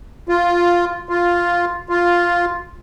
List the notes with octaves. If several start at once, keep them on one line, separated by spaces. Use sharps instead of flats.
F4
F4
F4